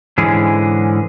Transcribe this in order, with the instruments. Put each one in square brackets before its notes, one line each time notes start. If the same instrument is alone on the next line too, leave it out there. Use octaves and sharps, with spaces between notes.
[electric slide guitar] G#2 D3 E3 G#3 C#4 G#4